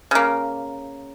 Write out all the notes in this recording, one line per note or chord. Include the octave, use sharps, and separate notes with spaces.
C#3 A#3